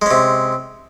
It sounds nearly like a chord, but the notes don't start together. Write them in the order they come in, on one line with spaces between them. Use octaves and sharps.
G#3 C#4 C3